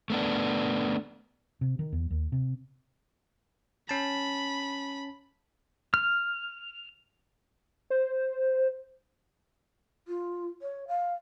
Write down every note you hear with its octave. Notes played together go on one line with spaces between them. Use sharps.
A3 B3 D4
C3
D#3
E2
D#2
C3
C#4 A5 B5
F6
C5
F4
C#5
F5